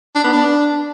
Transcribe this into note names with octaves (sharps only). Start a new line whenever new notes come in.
D4
B3
D4